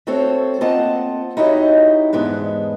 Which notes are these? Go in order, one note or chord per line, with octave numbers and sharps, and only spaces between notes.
A3 C4 F#4 A4 C5 C#5
A#3 C4 F4 D#5 F#5 A5
D#4 E4 F#4 G4 C#5 D#5
E2 G#2 G#3 B3 D4